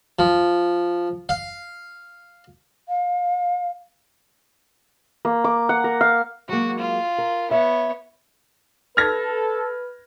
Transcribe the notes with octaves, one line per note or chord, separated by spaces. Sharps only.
F3
F5
F5
A#3
D6
F#5
A#4
F5
F#3 G#3 A#3 F#4
F4
A#4
B3 C#5 E5
A4 B4 F6 G#6 A#6